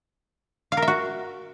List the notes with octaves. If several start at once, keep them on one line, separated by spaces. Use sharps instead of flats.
F5
A#4
E5
F#4